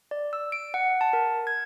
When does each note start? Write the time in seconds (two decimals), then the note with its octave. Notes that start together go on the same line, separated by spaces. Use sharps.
0.11 D5
0.33 E6
0.52 D7
0.74 F#5
1.01 A5
1.13 A#4
1.47 G#6